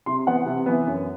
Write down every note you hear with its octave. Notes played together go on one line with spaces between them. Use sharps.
C3 C6
E3 B3 F#5
C3
E3 B3
F#2